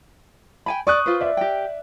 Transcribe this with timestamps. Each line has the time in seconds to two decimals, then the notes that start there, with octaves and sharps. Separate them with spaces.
0.66 G5 G#5 B5
0.87 D5 C#6 D#6 F#6
1.06 F4 B4 C5
1.21 D5 E5
1.37 G4 G5